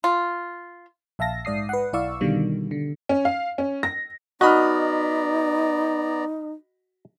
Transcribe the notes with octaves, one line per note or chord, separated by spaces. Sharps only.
F4
A#1 E5 F5 A5 A#6
G#2 D5 D#6 C7
B4 F#5
B1 E4 D5 F5 C#6 E6
B2 D3 D#3 G3
D3
C#4
F5
C#4
A#6
B3 D#4 F#4 D5 D#5 A#5 B5 F6